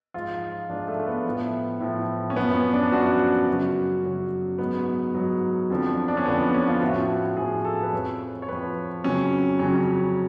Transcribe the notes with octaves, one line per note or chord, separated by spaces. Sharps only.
G#2 F3 F4
G#2 F3 D4
A3
A3
B3
A2 F3
A2 F3
C#4
F#2 F3 B3
C#4
D4
F#2 F3 F#4
F#2 C#3 F#3 F#4
F#2 C#3 F#3
G#2 F#3 B3
G#2 F#3
F2 D3 F3
D4
C#4
F2 D3 F3 B3
C#4
F4
A2 F3 F#4
A2 F3 G#4
A4
B4
F2 F3 C#5
C#5
F2 F3 B4
F2 C#3 F#3 C#4
F2 C#3 F#3 C#4